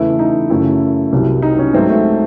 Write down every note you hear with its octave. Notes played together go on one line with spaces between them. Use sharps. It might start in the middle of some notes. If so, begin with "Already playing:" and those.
Already playing: E2 C#3 E3 A3 E4
D#4
F#2 C#3 F#3 A3 E4
C2 C3 F#3
D#4
C#4
G#2 F#3 A3 C4
A3